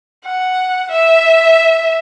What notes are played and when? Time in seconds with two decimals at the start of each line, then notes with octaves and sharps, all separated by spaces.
0.25 F#5
0.91 E5